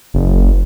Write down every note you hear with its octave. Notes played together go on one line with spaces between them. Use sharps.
F#1